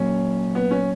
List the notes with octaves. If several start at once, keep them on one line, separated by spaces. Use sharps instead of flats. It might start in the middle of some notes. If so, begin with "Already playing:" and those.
Already playing: A#2 F#3 A#3 C#4
B3
C#4